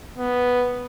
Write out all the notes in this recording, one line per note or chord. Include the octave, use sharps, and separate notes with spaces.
B3